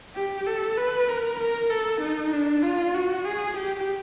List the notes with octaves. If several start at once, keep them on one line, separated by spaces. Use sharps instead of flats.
G4
A4
B4
A#4
A#4
A4
D#4
D4
F4
F#4
G#4
G4